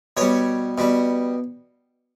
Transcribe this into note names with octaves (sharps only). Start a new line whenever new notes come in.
B2 G3 C#5
B2 G3